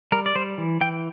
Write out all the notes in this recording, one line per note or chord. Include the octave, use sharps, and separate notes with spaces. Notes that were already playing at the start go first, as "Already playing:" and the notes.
G3 A#4
D5
G3 C5
E3
E3 G5